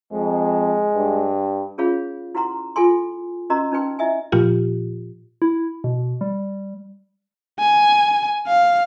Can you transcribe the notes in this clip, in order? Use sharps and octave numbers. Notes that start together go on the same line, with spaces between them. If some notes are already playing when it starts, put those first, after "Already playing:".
F2 G#3
G2
C#4 F4 G#4 C#5 F5 B5
E4 F#4 B4 F#5 A#5 C6
F4 A4 G#5 C6
C#4 F#4 A#4 D#5 A#5 C6
C#4 D#4 B4 G5 C6
E4 D#5 E5 G#5
A#2 F3 F4 G4
E4
B2
G3
G#5
F5